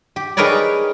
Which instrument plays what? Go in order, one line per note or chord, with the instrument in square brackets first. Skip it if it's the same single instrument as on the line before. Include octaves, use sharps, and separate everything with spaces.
[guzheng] G4
D#4 G#4 A#4 B4 C#5 D5